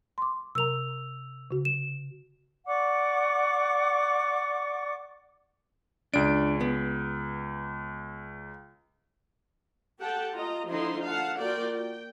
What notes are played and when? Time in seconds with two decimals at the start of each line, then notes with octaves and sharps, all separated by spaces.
0.18 C6 D6
0.55 C3 A#4 A#5 E6 F7
1.51 C#3 F#4
1.65 E7
2.66 D5 F#5 C#6 D6
6.14 C#2 D4 D7
6.61 B3
10.00 G4 A4 F#5 G5 A5
10.33 F4 D#5 A#5
10.68 D3 F3 D#4 E4 D#5 C6
11.03 F5 F#5 A5
11.38 A#3 F4 F#4 A#4 D5 G5
11.71 G5